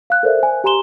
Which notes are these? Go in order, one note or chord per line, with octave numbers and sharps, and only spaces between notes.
F5 F#6
A4 A#4 C5 D5 E5
C5 G#5
G4 G#5 A#5 C6 E7 G7